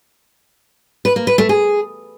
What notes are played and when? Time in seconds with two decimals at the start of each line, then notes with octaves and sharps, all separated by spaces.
1.05 B4
1.16 A#3
1.27 B4
1.38 A3
1.49 G#4